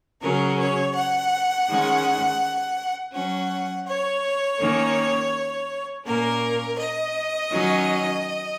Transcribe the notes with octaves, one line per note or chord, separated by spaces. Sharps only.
C#3 F#3 C#4 A#4
C#5
F#5
D#3 G#3 C#4
F#3 C#4 F#5
C#5
D#3 A#3 C#4
A#2 A#3 C#4 A#4
D#5
D#3 F#3 C#4